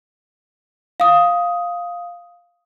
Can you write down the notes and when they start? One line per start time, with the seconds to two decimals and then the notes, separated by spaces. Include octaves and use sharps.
1.00 F5 D#6